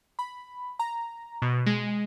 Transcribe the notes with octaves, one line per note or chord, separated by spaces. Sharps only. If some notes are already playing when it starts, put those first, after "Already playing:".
B5
A#5
B2
G#3